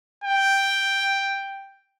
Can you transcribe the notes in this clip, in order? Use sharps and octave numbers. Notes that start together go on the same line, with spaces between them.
G5